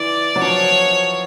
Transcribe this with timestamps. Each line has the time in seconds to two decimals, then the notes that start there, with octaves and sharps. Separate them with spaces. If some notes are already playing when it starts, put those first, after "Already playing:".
Already playing: E3 D5
0.36 F#3
0.42 F3 C#5